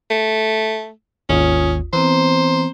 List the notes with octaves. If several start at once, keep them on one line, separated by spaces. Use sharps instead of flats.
A3
G#1 D#2 C#4 F4 D#6
E3 B3 C4 C5 A#5